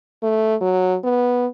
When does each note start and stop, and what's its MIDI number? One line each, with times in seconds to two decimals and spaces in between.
0.23 0.55 57
0.61 0.96 54
1.04 1.46 59